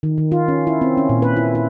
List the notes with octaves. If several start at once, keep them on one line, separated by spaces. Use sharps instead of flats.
D#3
D#3
F4
C#4
E4
C4
C#4
A#2
B4
E4
E4